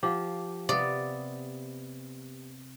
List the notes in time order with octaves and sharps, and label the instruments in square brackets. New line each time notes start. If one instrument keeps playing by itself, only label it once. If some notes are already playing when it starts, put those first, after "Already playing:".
[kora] F3 [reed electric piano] G4 [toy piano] F5 F#5 D6
[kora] C3 B3 [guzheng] D5 [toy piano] F5 B5 D#6